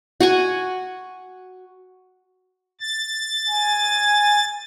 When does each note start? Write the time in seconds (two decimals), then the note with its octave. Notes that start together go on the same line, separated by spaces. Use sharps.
0.20 F#4 F#5 G#5
2.81 A6
3.49 G#5